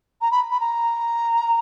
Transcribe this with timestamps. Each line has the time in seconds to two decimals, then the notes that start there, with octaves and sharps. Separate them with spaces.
0.21 A#5
0.31 B5
0.51 B5
0.60 A#5